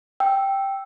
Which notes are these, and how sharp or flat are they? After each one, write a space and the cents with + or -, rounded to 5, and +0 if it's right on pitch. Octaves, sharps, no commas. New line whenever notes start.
G5 +0 E6 +0